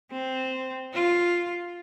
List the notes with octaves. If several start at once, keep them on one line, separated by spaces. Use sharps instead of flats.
C4
F4